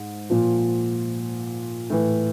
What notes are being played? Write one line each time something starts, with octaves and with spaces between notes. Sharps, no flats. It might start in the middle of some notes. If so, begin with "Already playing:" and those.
Already playing: G#2
A#2 F3
A2 E3